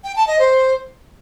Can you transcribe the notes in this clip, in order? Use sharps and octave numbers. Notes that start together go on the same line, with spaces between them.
G5
A5
D#5
C5